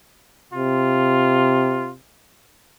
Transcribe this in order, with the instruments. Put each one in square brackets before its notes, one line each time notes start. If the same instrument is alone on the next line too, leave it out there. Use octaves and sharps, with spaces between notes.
[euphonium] C3 [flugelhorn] F4